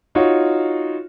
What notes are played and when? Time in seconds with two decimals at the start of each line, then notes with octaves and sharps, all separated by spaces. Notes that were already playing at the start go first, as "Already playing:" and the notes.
0.15 D#4 F4 F#4 C#5